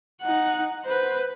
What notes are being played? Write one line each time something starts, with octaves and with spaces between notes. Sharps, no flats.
D#4 F#5
B4 C5